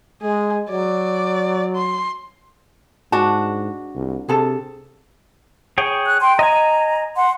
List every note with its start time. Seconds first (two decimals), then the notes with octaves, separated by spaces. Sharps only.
0.22 G#3 G#4
0.70 F#3 D5
1.76 C6
3.12 G#2 D4 F#4 A5
3.95 C2
4.29 C3 G#4 A4 A5
5.78 G#4 C#5 G5
6.06 F#6
6.21 G5 C6
6.39 D#5 G#5 A#5
7.16 F#5 C6